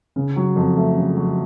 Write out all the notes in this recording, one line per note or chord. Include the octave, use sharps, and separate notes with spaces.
C#3
F#3
F2
A3
C#3
F#3